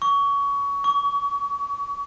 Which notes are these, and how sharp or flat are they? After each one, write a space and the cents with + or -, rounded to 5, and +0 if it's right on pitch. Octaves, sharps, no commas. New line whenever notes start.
C#6 +25
C#6 +40